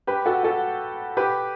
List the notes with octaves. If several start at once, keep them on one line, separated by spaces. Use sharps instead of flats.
G4 B4
F#4 A4
F#4 A4
G4 B4